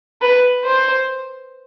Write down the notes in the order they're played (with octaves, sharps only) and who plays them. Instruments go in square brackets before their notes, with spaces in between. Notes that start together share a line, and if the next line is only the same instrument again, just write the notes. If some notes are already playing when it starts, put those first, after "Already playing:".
[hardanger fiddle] B4
C5